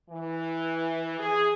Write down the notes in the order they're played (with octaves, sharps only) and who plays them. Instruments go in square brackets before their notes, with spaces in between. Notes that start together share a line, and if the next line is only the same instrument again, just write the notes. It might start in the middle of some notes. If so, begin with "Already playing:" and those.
[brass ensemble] E3
G#4